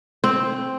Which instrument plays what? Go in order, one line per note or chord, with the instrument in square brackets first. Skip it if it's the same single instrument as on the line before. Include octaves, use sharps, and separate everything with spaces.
[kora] C4